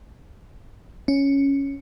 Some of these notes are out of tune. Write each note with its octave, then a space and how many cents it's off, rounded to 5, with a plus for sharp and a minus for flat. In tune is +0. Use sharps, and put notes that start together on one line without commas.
C#4 +0